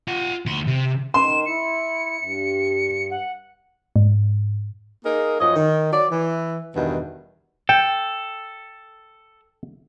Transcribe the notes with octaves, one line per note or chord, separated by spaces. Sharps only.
F4 F#5
D2 C6
C3
D#3 C6 E7
E4 C#7
G2
F#5
G#2
A#3 D#4 G#4 A#4
F#2 F3 C#5 D#5
D#3
F#3 D5
E3
E2 G2 B2 D#3
A4 G5